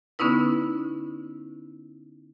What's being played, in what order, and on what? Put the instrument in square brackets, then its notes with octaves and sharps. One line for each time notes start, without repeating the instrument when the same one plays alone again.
[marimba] D3 B3 C#4 D#4 E4 B4